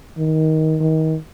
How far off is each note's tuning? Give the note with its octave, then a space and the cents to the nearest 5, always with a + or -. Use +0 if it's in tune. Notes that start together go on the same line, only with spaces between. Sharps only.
D#3 +20
D#3 +30